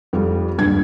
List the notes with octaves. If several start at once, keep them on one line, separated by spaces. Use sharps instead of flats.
F2 G3 G4
D#1 G2 G#6